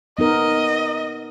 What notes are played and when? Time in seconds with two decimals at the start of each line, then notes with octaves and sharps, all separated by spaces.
0.19 B3 D#4 A#4 D#5